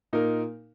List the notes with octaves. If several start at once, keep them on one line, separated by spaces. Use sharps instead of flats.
A#2 A#3 D#4 A#4